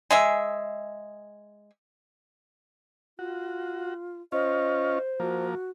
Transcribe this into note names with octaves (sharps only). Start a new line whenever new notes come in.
G#3 G#4 E5
F4 F#4
C#4 F4 C5 D#5
F3 A#3 F#4